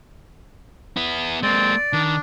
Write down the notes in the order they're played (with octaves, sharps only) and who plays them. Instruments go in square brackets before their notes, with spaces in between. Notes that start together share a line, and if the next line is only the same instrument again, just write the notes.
[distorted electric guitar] B3 E4
[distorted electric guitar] G#3 A#3 [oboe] C4 [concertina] D5
[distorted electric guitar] D#3 [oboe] D4